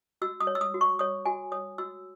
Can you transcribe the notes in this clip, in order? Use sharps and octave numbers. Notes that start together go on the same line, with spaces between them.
F#4 E6
D#6
C#5
E6
D#6
F#4
C#6
C#5 D#6
F#4 G#5
C#5 D#6
F#4 E6